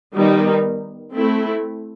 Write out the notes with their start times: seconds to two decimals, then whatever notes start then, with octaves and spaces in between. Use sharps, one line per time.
0.15 D#3 G3 B3 D#4
1.14 A3 C4 E4 A4